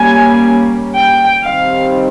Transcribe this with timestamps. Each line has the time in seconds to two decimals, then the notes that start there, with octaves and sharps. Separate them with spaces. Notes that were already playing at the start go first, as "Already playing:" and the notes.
Already playing: G3 A#3 C#4 G#5
0.96 G5
1.43 D#3 G3 C4 F5